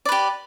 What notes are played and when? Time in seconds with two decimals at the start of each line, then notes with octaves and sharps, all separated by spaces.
0.05 D5
0.09 B4
0.12 G4